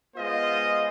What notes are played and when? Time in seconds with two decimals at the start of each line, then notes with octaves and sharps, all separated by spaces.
0.16 G#3 B3 F4 C5 D#5